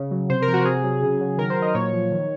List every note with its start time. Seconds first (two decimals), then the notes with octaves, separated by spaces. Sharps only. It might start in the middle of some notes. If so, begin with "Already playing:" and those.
Already playing: C#3
0.11 F#3
0.29 C3 C5
0.42 A#4
0.48 F3
0.53 F#4
0.65 C3 G#4
0.83 F#3
1.02 C#3
1.21 F#3
1.38 D#3 A#4
1.50 C5
1.56 F#3
1.62 D#5
1.74 A#2 C#5
1.93 F3
2.11 D#3